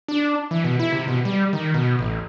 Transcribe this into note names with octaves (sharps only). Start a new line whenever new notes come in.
D4
E3
B2
E4
C3
B2
G3
D#3
B2
A1